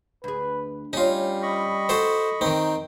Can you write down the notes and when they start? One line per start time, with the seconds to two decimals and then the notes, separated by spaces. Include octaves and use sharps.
0.24 D2 G#4 B4
0.93 G3 C#4 D#4 F4
1.42 D#5 B5 C#6
1.89 F#4 A4 C5
2.41 D#3 C4 D#4